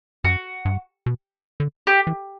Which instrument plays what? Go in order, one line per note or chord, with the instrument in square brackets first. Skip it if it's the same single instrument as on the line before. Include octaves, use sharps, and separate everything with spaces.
[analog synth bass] F#2 [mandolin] F#4
[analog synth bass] G2
B2
D3
[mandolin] G4
[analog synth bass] E3